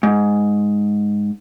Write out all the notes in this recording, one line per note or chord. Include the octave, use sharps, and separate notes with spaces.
G#2